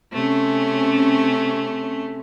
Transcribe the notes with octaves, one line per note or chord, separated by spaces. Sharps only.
C3 A3 C#4